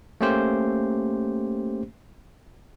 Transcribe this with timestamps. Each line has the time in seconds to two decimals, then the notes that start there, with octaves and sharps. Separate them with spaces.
0.21 A3 A#3 C#4 G4 C5